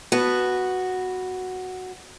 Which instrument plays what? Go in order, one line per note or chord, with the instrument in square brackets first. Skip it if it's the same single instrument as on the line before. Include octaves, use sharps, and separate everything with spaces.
[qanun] B3 B4 A5 [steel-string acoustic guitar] F#4